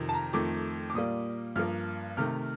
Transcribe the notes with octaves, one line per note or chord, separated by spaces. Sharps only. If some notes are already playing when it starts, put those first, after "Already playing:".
Already playing: F2 C3 D#3
A5
A#5
F2 D#3 A3 D6
D6
A#2 G3 A#3 D#6
G2 F3 A#3 F6
C3 D#3 A3 F6